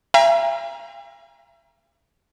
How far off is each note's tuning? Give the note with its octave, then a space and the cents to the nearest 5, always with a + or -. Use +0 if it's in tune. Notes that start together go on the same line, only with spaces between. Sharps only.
E5 +40 G5 +40 A#5 +20